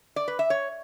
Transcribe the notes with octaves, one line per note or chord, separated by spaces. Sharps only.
D5
B4
E5
C#5